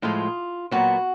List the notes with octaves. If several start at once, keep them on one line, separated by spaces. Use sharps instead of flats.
A2 F3 G#3 F4
A#2 F#3 B3 F#4